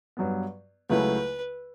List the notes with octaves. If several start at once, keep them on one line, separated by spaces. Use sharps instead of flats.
G2 F#3 B3
C#2 C#3 F#3 A3 E4 B4